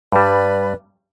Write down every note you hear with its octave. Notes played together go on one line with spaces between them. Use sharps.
G2 G3 B4 D5